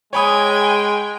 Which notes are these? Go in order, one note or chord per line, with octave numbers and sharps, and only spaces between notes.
G#3 C#5 G5 G#5 B5 D#6